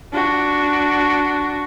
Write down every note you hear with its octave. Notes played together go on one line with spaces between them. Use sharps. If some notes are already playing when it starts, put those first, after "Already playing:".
D4 F#4